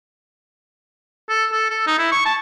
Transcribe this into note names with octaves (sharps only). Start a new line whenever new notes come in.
A4
A4
A4
D#4
E4
C#6
A5